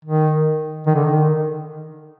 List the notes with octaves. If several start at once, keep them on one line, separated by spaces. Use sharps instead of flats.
D#3
D#3
D3
D#3